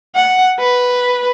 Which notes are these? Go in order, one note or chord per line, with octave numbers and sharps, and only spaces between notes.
F#5
B4